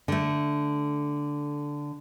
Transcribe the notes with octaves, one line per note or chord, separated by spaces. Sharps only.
D3 A3